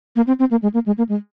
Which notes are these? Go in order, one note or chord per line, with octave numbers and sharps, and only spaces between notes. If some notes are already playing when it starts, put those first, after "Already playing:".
A#3
C4
C4
A#3
G#3
A#3
G#3
A#3
G#3